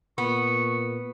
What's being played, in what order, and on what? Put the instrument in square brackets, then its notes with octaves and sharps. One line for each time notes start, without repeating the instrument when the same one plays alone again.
[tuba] A#2 [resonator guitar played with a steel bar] B3 [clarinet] C#6